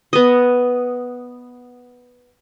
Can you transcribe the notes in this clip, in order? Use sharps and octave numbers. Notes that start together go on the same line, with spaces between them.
B3 D#5